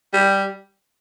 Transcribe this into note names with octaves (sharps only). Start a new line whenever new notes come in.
G3